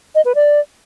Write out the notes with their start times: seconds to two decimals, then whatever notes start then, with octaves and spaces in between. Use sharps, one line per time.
0.15 D#5
0.25 B4
0.35 D5